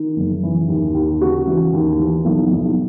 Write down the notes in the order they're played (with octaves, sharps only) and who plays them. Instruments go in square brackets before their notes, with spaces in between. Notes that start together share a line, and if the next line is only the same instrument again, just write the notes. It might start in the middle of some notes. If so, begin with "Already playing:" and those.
Already playing: [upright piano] D#3
F#1
E3
D#2
D#2
C#3 F#4
E3
D#2
E3
B1
B1